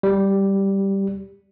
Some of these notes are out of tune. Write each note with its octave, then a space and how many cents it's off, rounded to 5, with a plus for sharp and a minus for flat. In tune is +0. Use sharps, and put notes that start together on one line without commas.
G3 -5